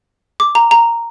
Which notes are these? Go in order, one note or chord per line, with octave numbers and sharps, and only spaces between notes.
D6
A#5
A#5